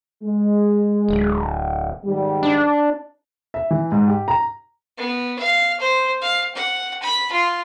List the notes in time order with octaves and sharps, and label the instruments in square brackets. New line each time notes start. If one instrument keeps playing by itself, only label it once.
[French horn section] G#3
[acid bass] D1
[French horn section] G#2 D#3 G3
[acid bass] D4
[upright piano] E5
E3
G#2
G4
A#5
[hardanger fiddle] B3
F5
C5
F5
F#5
B5
F4